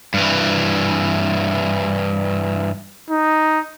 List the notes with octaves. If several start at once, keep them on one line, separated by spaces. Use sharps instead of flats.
G2 E3
D#4